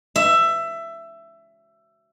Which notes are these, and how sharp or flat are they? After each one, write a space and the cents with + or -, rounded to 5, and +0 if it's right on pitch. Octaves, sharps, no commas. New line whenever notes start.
E5 +15